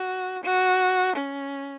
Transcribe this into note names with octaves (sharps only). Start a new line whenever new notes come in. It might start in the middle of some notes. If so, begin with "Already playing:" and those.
Already playing: F#4
F#4
C#4